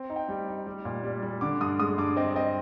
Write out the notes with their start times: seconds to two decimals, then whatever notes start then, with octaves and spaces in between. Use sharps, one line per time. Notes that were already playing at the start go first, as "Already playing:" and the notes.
Already playing: C4
0.10 D#4
0.16 G5
0.28 G3
0.48 D#4
0.66 G3
0.85 A#2
1.03 G3
1.23 G3
1.41 D3 D6
1.61 G2 D#6
1.79 G#3 D#6
1.98 G2 D6
2.17 C4 D#5
2.36 C4 D#5